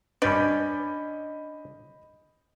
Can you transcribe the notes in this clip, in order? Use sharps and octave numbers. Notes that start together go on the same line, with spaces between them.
G2 C#4 D4 B4 D5 D#5 B5 G6